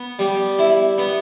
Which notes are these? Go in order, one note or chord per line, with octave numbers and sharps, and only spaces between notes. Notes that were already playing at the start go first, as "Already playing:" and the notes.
Already playing: B3
G3
E4
B3